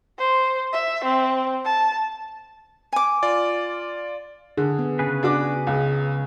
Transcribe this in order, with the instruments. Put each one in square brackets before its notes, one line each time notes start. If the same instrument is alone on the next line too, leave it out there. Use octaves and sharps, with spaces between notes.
[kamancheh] C5
E5
C4
A5
[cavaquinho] G#5 D6
[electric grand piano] F4 D5
[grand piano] D3 [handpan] G#4
[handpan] B3
[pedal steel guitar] C#3 G#4 B4
[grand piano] D4 F#4 D6
C#2